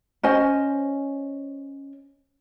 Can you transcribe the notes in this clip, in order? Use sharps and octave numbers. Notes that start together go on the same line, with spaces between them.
C#4 C5 D#5 G#5